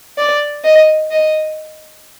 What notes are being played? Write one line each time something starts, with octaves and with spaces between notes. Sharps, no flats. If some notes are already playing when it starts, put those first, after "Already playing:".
D5
D#5
D#5